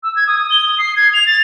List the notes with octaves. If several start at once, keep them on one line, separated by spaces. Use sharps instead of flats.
E6
G#6
D#6
G7
D#6
C7
G#6
F7
A6